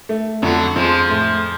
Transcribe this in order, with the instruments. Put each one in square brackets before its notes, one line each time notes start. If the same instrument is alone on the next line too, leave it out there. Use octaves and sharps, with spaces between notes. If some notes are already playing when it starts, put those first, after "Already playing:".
[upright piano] A3
[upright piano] F2 [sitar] D3 F#3
[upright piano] F2 [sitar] F3 G#3
[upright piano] A2